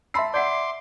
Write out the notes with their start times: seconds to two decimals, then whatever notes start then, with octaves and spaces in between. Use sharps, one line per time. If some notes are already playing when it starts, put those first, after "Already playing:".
0.14 E5 A5 B5 C6 E6 C7
0.34 D5 E5 F#5 C6 D6 G6